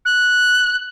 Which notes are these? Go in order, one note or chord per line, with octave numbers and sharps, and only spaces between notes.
F#6